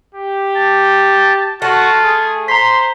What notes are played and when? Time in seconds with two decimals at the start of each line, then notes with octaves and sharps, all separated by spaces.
0.14 G4
0.56 A5
1.62 A3 F4 F#4
2.04 G#4
2.48 C5 A#5 C6 B6